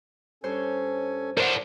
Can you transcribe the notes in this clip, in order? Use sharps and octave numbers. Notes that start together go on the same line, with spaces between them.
G2 C#4 A4 C5 C#5 G#5
A2 D4 A#4 C5 F#5